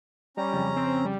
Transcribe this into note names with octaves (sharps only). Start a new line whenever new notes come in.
G3 C#4 A#5
F2 C#3
C4
G3